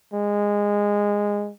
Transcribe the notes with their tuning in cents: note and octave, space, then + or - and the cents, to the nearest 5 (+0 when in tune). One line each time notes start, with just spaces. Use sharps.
G#3 -15